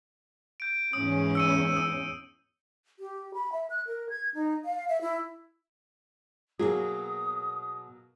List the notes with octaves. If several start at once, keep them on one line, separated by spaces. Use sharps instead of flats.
G6 D7
E2 G#2 C#4 D#6
E6 C#7 D#7
D#6 E6 D#7
G4
B5
E5
F#6
A#4
G#6
D#4
F5
E5
E4
B2 F#3 A#3 G#4 D#6